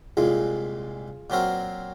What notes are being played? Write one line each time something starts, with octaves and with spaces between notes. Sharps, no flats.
C2 A#2 G#3 F4 G#4
A#2 F#3 C4 F#4 A#4